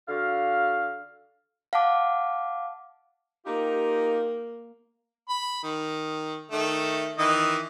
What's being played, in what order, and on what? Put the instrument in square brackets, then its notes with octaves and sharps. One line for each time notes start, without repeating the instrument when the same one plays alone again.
[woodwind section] D3 F#4 F5
[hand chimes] F5 F#5 A5 D6
[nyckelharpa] A#3 A#4 [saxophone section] D#4 F4 G4
[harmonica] B5
D#3
D#3 A3
D#3 E3 D#5